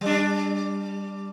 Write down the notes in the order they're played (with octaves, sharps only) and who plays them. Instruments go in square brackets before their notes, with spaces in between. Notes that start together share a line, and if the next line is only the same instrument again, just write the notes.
[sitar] G3 D4